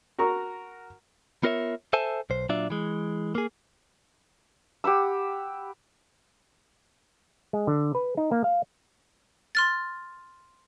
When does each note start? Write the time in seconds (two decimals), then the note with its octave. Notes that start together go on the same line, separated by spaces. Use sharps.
0.19 F#4 A#4 A#5 C#6
1.43 B3 F4 A#4 C#5 D#5 E5
1.93 A4 C5 E5 G#5 A5
2.30 B1 C5
2.49 A#2 F#3 D4 F4 D5 E5
2.70 E3 G#3
3.35 A#3 G#4
4.84 G4 F#5 B5 E6
7.53 G#3
7.67 D3
7.95 B4
8.17 D#4
8.31 A#3
8.44 F5
9.55 C6 F6 A6